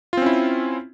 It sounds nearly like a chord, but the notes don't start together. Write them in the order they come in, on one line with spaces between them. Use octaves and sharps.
F4 C4 C#4 E4